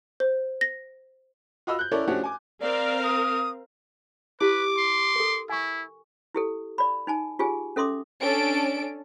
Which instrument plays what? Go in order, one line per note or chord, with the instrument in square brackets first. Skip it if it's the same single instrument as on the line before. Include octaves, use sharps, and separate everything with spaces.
[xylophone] C5
A#6
[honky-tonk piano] F4 F#4 D#5 B5 E6
F#6 G6
C#4 E4 A4 A#4 C#5 D5
F3 A3 C#4 D4 F#4 G4
G#5 D6
[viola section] C4 A#4 F5 [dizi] D5
[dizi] D#6
[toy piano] E4 G4 [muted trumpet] B4 [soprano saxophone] D6
[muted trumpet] C6
[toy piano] A4 A#4
[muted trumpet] E4 [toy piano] G#5 C#6
[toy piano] E4 G4 A4
D5 B5
D#4 G#5 A5
F4 G4 G#4 G#5
C#4 A4 E5 C6 D6 D#6
[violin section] C#4 D4 A4 D7